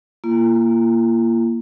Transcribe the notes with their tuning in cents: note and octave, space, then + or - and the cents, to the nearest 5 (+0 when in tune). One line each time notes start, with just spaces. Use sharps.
A#3 +0 F4 -45